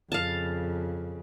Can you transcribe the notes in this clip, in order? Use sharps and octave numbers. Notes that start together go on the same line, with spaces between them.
F2 C#3 F5 A5